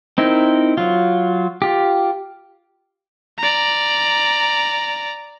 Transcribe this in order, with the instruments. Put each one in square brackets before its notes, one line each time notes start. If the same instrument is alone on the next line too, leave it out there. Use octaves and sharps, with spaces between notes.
[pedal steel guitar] C4 D#4 E4 A#4
F#3 F4
F4 G4
[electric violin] D5 A#5